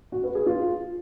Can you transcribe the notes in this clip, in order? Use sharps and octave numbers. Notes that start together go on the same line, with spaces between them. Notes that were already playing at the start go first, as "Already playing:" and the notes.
F#4
B4
G#4
F4